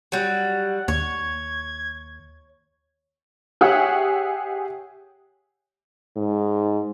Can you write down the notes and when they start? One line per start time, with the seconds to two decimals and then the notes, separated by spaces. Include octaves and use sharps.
0.12 F#3 G3 F#5
0.88 D#2 C#5 G#6
3.61 G4 G#4 C#5 E5 F#5
6.16 G#2